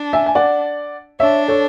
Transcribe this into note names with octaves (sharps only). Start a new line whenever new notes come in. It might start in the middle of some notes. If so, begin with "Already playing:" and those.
Already playing: D4
E5 G#5
G#5
D5 F#5
D4 C#5 E5
A4 C#5